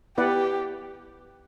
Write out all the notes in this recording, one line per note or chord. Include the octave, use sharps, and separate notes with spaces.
B3 E4 G4 B4 D5 F#5